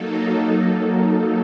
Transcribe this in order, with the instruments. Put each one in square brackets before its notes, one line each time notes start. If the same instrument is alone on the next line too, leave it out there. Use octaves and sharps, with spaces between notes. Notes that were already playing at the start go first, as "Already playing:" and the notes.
Already playing: [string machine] F#3 A#3 D#4 A4